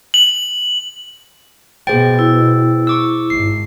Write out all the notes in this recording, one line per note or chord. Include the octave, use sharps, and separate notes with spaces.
F#7
B2 G#4 C5 G5 A6
E4
C#6 D6 E6
G#1 C7